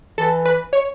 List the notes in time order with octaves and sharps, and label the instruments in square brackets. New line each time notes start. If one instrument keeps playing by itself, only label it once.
[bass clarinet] E3 [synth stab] A4
[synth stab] B4
C#5